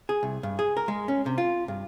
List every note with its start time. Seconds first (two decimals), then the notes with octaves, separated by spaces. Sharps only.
0.09 G#4
0.23 C2
0.43 G2
0.59 G#4
0.77 A#4
0.88 G#3
1.08 C#4
1.26 C3
1.38 F4
1.68 G2